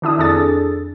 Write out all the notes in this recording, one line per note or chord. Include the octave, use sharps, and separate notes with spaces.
D#3 D4 E4 D#6
F2 D4 G#4 A4 A6